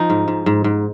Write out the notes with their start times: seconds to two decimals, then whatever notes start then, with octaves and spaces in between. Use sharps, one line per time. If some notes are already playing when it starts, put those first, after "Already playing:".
Already playing: F3 D#4
0.10 G#2
0.28 G#2
0.46 G#2
0.64 G#2